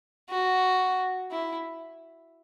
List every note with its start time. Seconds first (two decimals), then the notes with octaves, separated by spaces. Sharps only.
0.30 F#4
1.31 E4